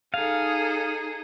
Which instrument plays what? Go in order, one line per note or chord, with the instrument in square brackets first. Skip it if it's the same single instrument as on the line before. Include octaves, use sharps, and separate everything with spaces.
[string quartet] D#4 G#4 A4 [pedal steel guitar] F5